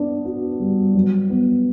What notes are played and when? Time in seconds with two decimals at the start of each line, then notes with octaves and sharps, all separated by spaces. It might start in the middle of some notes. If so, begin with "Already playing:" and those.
Already playing: B3 D4
0.25 F#4
0.60 G3
0.95 F#3
1.30 B3